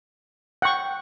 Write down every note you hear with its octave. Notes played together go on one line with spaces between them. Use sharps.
F#5 G5 C#6